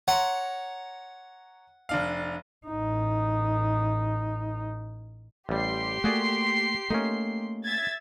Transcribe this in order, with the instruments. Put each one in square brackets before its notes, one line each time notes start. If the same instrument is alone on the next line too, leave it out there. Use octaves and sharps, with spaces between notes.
[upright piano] C#5 A#5 C6 [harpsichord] F#5
[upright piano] F1 D4 F5
[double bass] A1 D#4
[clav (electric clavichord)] A1 G3 [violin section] G4 C6 C7
[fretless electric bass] A3 A#3 [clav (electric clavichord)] F#4 G#4 D5
[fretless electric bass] A3 A#3 [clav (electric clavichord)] C#4 D#4
[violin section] E5 G#6 A6